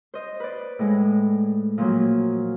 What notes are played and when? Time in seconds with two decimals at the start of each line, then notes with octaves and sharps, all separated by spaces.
0.14 C5 D#5
0.40 B4 D5
0.79 A2 G#3
1.78 A#2 F3 F#3